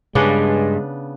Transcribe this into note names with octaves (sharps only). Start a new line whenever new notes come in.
G2 C#3 G#3 B3 D4